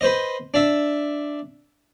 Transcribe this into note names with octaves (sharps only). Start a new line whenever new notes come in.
B4 C5 D#5
D4 E5